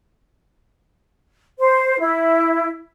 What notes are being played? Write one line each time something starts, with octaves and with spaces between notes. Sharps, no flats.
C5
E4